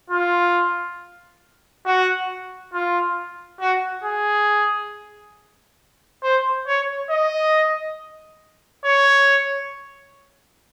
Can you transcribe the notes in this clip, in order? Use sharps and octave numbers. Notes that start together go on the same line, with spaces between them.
F4
F#4
F4
F#4
G#4
C5
C#5
D#5
C#5